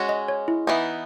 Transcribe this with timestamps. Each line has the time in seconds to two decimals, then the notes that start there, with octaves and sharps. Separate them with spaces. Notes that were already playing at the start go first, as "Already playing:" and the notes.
Already playing: G#3 C#4 F#4
0.09 D#5
0.28 C#5
0.48 E4
0.67 E3 B3 D#4